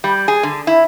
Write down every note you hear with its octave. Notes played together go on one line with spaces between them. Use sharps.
G3
G#4
D3
E4